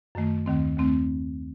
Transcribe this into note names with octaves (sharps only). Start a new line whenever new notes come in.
F#2 D#3 A3
D#2 D#3 A3 C4
D#2 D#3 A3 C4